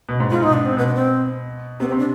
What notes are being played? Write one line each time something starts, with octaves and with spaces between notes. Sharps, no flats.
B2
G#2
G#2 F4
B2 D#4
D4
C4
B2 B3
D4
C4
C3 B3
C4
C3
D4